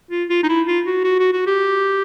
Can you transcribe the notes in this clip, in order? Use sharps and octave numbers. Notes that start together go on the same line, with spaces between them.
F4
F4
D#4
E4
F4
F#4
F#4
F#4
F#4
G4